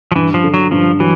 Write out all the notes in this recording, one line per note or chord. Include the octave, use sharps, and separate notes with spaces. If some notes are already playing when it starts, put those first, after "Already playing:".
F3
G2 E3
F3
D3
F#3
G2 F3
E3 F#3